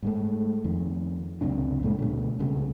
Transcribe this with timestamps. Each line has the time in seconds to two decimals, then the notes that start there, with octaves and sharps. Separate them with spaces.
0.03 G#2 G#3 A3
0.64 F2 D#3
1.41 C#2 F#2 C3 D4
1.83 A#2 G#3 A3
1.99 D2 B2
2.39 C2 C#3 G3 A3